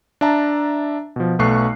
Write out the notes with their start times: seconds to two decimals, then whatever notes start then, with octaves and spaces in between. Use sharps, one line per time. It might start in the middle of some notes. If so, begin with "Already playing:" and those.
0.21 D4 E5 A5 A#5
1.16 B2 F3
1.39 B1 A3 B3 C#6 F#6 C7